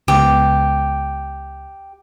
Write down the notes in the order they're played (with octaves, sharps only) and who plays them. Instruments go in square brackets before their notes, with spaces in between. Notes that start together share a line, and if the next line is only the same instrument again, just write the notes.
[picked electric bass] C#2 B3 [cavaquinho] G4